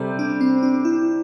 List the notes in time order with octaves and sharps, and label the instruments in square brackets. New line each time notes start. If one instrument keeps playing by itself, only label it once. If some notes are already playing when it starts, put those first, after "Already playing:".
Already playing: [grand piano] C3 G3 [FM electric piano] A4 C5
[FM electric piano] D4
C4
D4
E4